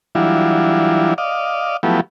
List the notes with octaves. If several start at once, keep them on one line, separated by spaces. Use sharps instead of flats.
E3 F#3 G3 D4 E4 F4
D5 D#5 F5
F3 F#3 A3 B3 E4 G4